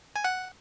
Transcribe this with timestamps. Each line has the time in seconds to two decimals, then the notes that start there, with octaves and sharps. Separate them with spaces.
0.16 G#5
0.24 F#5